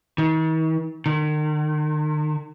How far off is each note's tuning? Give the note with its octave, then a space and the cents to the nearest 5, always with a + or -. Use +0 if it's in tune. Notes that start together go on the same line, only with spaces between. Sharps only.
D#3 +45
D#3 -40